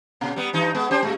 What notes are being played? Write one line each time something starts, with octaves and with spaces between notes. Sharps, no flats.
A#2 C#3
G3 B3
G2 E3 D#4
G#3 B3
C#4 G4 C5
A2 G#3